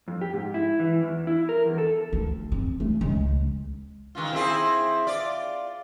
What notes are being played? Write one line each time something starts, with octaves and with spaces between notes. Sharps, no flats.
F2
G4
G#2
E4
E3
E2
E4
A#4
E2
A4
D2
C4
A3
C#2
D#3 G#3 F4
C4 E4 G#4
F4 D5